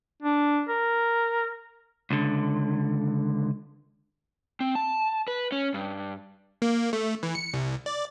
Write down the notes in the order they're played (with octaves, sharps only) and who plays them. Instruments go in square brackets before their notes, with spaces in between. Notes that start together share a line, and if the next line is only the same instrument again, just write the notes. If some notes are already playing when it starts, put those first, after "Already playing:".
[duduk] D4
A#4
[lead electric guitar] C#2 D3
[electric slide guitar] C4
A5
B4
C#4
G2
[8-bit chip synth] A#3
A3
E3
C#7
C2
D5